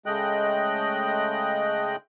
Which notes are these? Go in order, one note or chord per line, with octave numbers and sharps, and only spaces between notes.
C#3 G#3 A3 D#5 G5 F#6